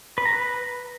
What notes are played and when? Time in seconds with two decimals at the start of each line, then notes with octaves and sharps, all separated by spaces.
0.18 B4
0.25 A#5
0.33 B4